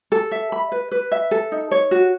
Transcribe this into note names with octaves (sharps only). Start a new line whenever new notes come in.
A4
E5
B5
B4
B4
E5
A4
D#4
C#5
F#4